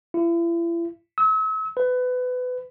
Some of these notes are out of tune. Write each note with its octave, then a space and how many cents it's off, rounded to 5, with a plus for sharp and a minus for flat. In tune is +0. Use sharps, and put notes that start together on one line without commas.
E4 +40
E6 -40
B4 +25